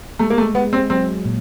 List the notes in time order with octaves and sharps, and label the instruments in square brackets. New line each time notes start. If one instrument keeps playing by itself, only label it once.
[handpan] G#3 [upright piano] A3
[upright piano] A#3
A3
[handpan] G#3 [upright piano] B3
[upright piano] C4
[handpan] F#3 [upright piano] C4
[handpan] A#2